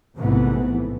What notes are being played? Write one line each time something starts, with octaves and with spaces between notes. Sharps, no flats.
A#1 G#2 C3 E3 A3 B3